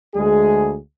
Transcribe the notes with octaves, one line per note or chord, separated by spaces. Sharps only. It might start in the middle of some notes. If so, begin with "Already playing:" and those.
D2 G#3 G#4